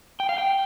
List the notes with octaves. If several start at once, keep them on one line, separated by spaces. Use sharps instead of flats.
G5
F5
G5